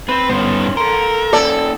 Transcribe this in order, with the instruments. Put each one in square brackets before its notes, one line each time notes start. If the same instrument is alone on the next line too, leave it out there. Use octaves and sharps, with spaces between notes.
[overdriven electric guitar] C4 [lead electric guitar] B4
[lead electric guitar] G2 B3 [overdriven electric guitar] C#4 C5
[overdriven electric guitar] A4 C6 [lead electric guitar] A#4
[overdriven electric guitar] A#3 C#4 [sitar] A4 D5